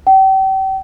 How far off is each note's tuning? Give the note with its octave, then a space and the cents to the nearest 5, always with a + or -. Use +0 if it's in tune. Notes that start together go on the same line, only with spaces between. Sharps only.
G5 -35